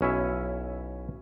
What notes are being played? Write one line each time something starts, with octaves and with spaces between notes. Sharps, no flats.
B1 C#4 E4 E5